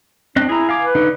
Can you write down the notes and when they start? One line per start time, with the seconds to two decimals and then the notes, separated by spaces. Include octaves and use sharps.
0.36 C4 D4 D#5 F#6
0.49 E4 G#4 A#5
0.69 F5 G#5 D6
0.81 B4
0.95 D3 D#4